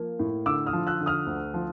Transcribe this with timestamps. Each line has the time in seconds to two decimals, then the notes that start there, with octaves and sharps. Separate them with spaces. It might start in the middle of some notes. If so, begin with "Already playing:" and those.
Already playing: F3 A#3
0.19 A2
0.46 D3 D6 E6
0.67 D#6 F6
0.73 F3
0.87 E6 F#6
1.01 D3
1.06 D#6 F6
1.26 D2
1.54 F3